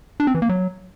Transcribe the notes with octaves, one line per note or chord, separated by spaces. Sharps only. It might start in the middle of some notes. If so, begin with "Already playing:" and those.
D4
C4
E3
A#3
F#3